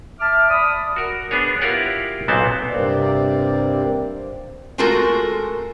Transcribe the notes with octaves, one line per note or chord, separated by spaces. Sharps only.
E5 A5 D6 F6
D5 B5 D#6
F#4 A#4
B3 D4 G#4 C#5
E4 F4 G4 A#4 C#5 F#5
B1 A#2 B3 C4 C5 A5
G2 C3 A#3 C4 D5
G#3 A3 F4 F#4 A4 A#4